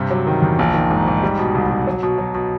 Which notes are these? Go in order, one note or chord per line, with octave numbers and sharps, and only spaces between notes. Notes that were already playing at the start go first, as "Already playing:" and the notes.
Already playing: G2 C3
F#3
D#3
E2
A#1
D#3
G#2
G#2
G3
B2
C2
B2
F#3
B2
F#3
B2